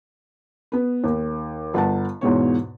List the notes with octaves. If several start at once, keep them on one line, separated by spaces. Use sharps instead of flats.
B3 B4
D#2
G1 F#5 A5
E2 G#2 B2 C#5